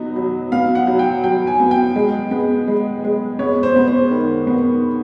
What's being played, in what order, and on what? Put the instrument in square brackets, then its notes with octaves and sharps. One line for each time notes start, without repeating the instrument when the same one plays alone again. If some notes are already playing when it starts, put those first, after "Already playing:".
Already playing: [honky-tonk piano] F#3 B3 D#4
F#3
[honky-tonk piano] B3 [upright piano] F5
[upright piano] F#5
[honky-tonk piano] F#3
[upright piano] G5
[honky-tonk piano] F#3 [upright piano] G5
[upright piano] G#5
[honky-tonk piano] B3
[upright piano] G5
[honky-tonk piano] G#3
B3
G#3
G#3
[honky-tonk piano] B3 [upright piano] C#5
[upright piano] C5
[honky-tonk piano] B3
[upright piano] C5
[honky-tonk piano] D#3
B3